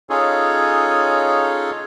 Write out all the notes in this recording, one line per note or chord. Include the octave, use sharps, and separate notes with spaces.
C#4 D#4 F4 G#4 A4 C#5